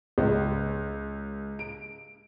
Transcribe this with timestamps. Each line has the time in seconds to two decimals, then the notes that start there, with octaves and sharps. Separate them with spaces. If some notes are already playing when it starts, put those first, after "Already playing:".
0.18 C#2
1.59 D7